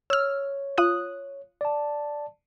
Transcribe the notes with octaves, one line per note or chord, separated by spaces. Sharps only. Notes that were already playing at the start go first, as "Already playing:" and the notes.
C#5 E6 F6
F4 D#6 F#6
D5 A5